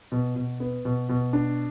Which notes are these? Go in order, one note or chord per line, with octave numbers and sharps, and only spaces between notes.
B2
B2
B3
B2
B2
D4